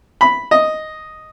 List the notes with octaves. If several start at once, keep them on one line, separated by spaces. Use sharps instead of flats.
B5
D#5